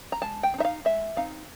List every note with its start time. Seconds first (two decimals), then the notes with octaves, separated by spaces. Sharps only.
0.12 A#5
0.22 G#3 A5
0.43 G5
0.54 C4
0.58 D#4 E5
0.65 F5
0.85 G#3 E5
1.17 C4 D#4 F5